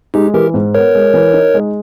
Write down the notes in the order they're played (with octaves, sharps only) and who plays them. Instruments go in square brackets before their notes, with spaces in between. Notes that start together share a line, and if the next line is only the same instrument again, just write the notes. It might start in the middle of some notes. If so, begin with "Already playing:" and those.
[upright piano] G#3 [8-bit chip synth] D#4 G4
[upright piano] E3 [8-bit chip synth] G4 A#4
[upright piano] G#2
[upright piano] B3 [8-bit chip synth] A#4 C#5
[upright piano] G#3
E3
D#4
G#3